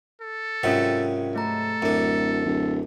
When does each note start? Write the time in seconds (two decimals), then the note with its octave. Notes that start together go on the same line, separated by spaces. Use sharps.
0.21 A4
0.63 G#2 C3 F#3 C#4 F4 A#4
1.36 A3 A4 A#5
1.82 D1 F#2 D4
2.46 D1